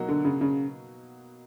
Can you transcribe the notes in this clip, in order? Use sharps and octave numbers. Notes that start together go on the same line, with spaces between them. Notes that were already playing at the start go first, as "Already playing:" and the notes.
Already playing: B2 F#3 A#3 D#4 F#4
D3
C#3
C#3